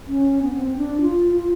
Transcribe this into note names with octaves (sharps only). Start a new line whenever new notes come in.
C#4
B3
C4
D4
F4
F4